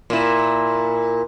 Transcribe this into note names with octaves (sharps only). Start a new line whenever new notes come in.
A#2 E4